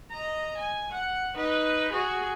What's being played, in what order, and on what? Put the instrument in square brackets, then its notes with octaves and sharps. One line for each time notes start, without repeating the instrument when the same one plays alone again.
[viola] D#5 A#5
G#5
F#5
D#4 B4
F#4 G#4